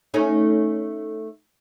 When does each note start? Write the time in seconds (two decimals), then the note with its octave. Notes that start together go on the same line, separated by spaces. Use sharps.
0.14 A3 C#4 D#4